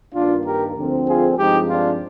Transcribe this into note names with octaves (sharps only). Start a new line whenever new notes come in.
G2 D#3 A#3 D4 F4
G4 A#4
D2 D3 F3 C4
F4 G#4
G2 F3 G#3 C4 D#4 G4
D4 F4